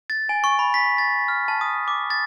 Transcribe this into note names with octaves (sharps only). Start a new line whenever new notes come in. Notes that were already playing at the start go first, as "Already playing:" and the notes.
A6
G#5
C#6
B5
B6
A6
F6
A5
D#6
D6
A6